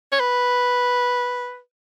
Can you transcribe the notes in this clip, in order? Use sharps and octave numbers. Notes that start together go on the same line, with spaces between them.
C#5
B4